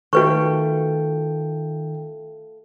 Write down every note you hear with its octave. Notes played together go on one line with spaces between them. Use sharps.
D#3 A3 F4 F#4 A4 B4 G5 C#6